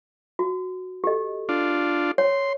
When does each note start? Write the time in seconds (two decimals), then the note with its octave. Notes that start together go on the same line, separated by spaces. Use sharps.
0.39 F#4
1.04 G4 A4 D#5
1.49 D4 F4
2.18 C#5 C6